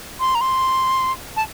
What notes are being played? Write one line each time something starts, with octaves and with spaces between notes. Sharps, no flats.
C6
A#5
C6
A5